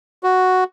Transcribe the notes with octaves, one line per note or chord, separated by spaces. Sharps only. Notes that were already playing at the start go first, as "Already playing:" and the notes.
F#4